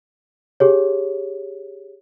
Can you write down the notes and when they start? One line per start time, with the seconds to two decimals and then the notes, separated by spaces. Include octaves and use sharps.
0.60 G4 G#4 C#5